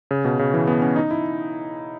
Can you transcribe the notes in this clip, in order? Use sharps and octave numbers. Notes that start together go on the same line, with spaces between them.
C#3
B2
C#3
E3
B3
C#4
D#4
E4